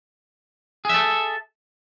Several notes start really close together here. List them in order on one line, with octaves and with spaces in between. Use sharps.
G#4 E5 A4